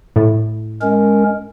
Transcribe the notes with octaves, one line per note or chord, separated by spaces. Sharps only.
A2
G#3 C#4 A#4